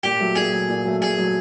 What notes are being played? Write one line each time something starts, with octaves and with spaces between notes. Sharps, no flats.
A#2 G4
F#3 A3
A#2 G#4
F#3 A3
A#2
F#3 A3
A#2 G#4
F#3 A3